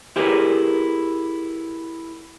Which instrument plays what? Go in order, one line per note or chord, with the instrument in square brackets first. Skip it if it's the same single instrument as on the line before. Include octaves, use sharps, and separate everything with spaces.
[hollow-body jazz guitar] E4 G4 G#4 A#4 B4